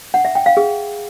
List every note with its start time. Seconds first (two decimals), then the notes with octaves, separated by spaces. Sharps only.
0.14 F#5
0.25 E5
0.35 G5
0.46 F5
0.57 G#4